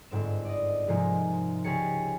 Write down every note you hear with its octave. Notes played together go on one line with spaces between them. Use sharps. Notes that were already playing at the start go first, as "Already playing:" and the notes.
G1 G#2 C4 E7
D5 D#5
G#2 C3 F3 G#3 A#3 D#4
C#2 C#4 G4 G#4 A5 C#7